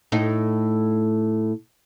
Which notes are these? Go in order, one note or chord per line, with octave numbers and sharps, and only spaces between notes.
A2 D#4